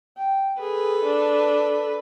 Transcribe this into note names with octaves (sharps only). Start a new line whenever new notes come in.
G5
G#4 A4 B4
D4